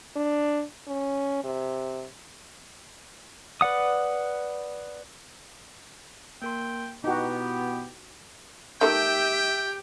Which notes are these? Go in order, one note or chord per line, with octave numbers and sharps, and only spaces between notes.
D4
C#4
C3
B4 D5 F#5 D#6
A#3 A#4 G5 C6
B2 B3 D#4 E4 F#4 G4 G5
D#3 A3 G4 E5 G5